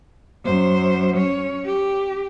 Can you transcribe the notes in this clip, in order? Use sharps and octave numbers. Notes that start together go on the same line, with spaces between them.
F#2 C5
C#4 C#5
G4